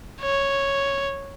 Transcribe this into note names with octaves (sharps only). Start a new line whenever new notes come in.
C#5